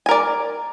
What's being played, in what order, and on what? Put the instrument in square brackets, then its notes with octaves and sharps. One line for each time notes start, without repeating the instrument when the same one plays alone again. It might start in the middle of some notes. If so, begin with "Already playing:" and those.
[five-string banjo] G#5
A#4
D5